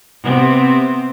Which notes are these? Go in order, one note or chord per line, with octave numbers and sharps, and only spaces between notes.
C3 B3 C4